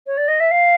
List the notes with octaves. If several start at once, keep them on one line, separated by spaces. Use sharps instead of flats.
C#5
D5
D#5
E5
F5